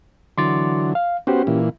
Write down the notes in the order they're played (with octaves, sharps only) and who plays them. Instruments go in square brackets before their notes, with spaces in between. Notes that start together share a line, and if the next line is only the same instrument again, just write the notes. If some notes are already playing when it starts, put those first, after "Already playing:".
[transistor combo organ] D3 E3 F#3 [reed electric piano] C6 D6 A6
[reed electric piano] F5
[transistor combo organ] B3 F#4 C5 [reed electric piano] C#4 G4
[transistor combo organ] A#2 E3